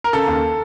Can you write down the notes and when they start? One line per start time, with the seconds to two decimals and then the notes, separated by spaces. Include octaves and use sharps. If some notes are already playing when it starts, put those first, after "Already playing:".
0.04 A#4
0.13 C#3 A4
0.27 D#2